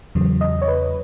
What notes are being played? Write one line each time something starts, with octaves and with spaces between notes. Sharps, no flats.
E2 C#3 F#3
D#5
C#5
B4